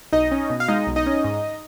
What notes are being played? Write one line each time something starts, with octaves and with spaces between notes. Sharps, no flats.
B1 D#4 D#5
C#4
B2
F5
G#3 D#4 D#5
B1
D#4 D#5
C#4
G#2